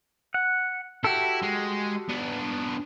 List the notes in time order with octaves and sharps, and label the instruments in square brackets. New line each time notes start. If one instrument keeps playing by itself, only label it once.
[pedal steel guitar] F#5
[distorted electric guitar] E4 [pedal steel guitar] F#4 G4 A4
[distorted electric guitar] G#3
B3 D4